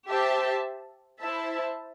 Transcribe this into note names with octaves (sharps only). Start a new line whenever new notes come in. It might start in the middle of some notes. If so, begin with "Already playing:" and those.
G4 C5 E5 A5
E4 C5 E5 A5